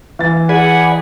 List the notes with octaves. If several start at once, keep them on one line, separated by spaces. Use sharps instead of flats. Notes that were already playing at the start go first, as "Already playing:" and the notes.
E3 A6
G#4 D5 F#5 G#5 B5